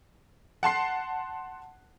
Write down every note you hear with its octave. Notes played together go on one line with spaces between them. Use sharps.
F#5 A5 C6 C7